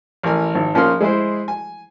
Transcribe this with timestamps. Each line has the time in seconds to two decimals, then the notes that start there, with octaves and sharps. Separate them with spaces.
0.23 A1 A#4 G#5
0.55 G#1
0.74 A#1 F3 C#4 A#4 C6 F6
1.01 G#3 E4 G#4 C5
1.48 G#5